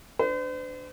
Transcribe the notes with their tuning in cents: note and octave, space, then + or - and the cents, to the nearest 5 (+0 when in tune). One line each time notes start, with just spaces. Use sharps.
D4 +0 C5 -45